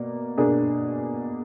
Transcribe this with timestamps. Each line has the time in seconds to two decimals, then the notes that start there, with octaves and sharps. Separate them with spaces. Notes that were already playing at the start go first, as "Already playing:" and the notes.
Already playing: B2 A#3 D5
0.38 B2 A#3 D4 G#4 D5